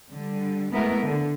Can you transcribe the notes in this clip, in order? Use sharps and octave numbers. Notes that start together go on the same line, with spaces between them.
D3 G3
G#3 A3 B3 E4 A#4
D3